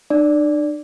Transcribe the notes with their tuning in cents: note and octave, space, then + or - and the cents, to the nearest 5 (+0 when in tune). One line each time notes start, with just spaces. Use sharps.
D4 +45 D5 -10